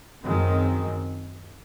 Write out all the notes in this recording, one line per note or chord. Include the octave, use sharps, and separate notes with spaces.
F#2 D#3 G#3 C4